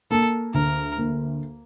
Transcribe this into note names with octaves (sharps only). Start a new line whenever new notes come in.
A#3 A4
D2 A#4
A#3